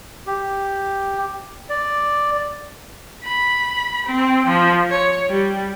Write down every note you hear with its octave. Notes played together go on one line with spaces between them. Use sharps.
G4
D5
B5
C4
F3
C#5
G3